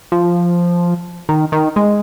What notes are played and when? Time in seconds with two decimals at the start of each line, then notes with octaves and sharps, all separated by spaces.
0.12 F3
1.29 D#3
1.52 D#3
1.76 G#3